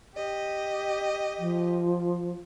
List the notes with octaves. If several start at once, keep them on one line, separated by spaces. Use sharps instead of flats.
G4 D#5
F3